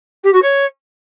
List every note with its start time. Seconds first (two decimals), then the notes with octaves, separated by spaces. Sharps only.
0.23 G4
0.33 F#4
0.42 C#5